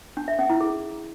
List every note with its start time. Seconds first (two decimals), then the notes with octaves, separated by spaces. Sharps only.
0.17 D4
0.28 E5
0.39 C#4
0.50 E4
0.61 G#4